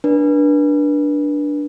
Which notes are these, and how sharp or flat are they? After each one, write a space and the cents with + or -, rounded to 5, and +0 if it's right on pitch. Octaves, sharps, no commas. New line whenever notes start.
D4 +0 B4 -35